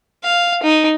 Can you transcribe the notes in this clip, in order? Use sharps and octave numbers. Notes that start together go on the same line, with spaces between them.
F5
D#4